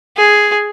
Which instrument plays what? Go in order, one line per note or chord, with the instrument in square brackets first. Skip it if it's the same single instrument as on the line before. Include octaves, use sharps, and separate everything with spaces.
[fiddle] G#4